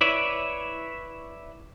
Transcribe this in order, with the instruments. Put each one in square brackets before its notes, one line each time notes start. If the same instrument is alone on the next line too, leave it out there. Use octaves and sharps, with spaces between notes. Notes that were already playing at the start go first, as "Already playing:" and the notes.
[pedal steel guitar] E4 B4 C#5 D5 E5